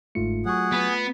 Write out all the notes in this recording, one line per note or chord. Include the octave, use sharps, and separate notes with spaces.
G1 G#2 A3 F4 C#7
F#3 F#4 G#4 F#5 C#6
B3